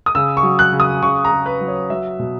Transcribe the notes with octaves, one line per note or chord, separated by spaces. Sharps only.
D#6
C#3 E6
C#6
F#3
F#6
C#3
D#6
C#3 C#6
A#5
C#3
B4
F#3
C#5
F#3 E5
B2